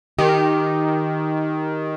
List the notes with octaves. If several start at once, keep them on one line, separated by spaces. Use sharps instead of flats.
D#3 G4